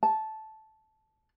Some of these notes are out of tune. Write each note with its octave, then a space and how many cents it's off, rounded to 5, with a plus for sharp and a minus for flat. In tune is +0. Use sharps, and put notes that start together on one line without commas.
A5 -10